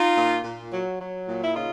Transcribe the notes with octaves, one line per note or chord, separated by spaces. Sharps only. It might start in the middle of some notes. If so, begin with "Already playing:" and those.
Already playing: D#4 F4
A#2
A#2
F#3
F#3
A#2
E4
C#3 D#4 F4